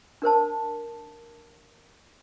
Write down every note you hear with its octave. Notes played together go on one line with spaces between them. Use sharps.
D4 A#4 C5 A5